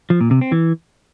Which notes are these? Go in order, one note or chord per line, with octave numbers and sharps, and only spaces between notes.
F3
A#2
C3
C4
E3